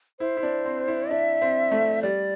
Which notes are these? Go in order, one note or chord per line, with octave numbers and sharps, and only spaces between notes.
E4 C5
E4
D4
C4
E4
D4 E5
C4
A3
G3 D5